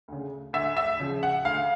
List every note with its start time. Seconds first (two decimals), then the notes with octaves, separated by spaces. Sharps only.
0.08 D2 C#3
0.53 D2 E5
0.77 E5
1.00 C#3 F3
1.23 F#5
1.45 D2 F5